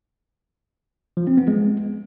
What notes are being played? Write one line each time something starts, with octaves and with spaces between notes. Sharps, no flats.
F3
C4
B3
G#3